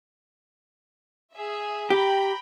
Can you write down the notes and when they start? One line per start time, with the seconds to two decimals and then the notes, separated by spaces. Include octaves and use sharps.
1.35 G#4 E5
1.90 G4 G5 A#5 B5